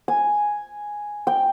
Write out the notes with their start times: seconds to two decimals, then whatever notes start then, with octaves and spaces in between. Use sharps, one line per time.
0.08 G#5
1.27 G5